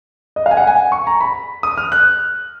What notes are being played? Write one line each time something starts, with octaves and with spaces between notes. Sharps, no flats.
D#5
F5
G#5
F#5
G#5
C#6
A#5
B5
D#6
F6
F#6